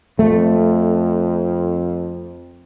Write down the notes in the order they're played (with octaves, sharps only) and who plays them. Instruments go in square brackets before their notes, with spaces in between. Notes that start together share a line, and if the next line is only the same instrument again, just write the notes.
[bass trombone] F2 [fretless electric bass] A3